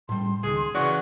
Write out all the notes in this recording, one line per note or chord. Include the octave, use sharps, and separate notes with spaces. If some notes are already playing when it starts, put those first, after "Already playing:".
A2 G3 C6
C#2 D#3 G#4
C#3 E3 F#4 D5